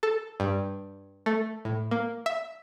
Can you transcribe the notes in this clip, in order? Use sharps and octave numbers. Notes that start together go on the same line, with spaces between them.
A4
G2
A3
A2
A#3
E5